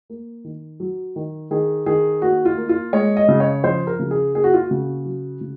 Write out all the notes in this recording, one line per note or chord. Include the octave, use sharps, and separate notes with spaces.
A#3
D#3
F#3
D#3
D#3 G#4
D#3 G#4
A#3 F#4
F4
A#3
F4
G#3 C#5
D#5
C#3
C#5
F3 C5
A#4
C#3
G#4
A#3 G#4
F#4
F4
F#4
C#3
F#3
C#3